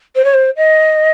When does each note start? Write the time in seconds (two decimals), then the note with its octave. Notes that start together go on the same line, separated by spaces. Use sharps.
0.15 C5
0.24 C#5
0.33 C5
0.56 D#5